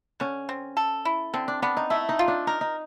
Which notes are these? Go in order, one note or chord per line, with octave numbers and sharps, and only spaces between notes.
D3 C#4
C4
A4
E4
D3 C4
D4
B3 D4
D#4
A3 E4
D#4
F4
D4
D#4 A#4
D#4